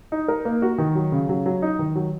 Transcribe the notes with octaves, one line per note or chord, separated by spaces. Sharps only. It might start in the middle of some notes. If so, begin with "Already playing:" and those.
D#4
A#4
A#3
F#4
D#3
F#3
C#3
F#3
F#3
D#4
D#3
F#3